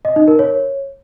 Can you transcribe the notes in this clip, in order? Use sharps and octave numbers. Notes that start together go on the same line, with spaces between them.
D#5
D#4
A#4
C#5